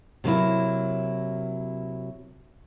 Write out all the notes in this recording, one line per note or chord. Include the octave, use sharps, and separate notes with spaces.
C3 F#3 A#3 E4